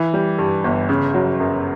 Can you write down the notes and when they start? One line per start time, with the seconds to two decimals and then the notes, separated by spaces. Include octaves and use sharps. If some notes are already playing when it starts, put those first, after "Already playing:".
Already playing: E3
0.14 G3
0.39 G2
0.64 G1
0.89 C#3
1.14 F#3
1.40 F#2